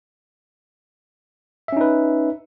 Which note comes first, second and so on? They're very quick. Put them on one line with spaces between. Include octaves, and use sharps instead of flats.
E5 C#4 D#4 B4